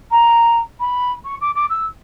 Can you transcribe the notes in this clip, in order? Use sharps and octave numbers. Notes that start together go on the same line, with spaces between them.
A#5
B5
C#6
D6
D6
E6